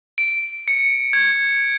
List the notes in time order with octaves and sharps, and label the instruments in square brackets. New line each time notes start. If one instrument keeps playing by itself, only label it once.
[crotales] D7
C#7
G#6